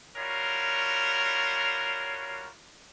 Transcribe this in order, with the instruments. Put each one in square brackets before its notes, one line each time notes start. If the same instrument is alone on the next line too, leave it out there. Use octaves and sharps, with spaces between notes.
[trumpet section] G3 F4 F#4 A#4 C#5